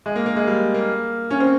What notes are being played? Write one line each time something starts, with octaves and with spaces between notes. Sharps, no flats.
G#3
A#3
A#3
G#3
G3
A#3
C#4
C4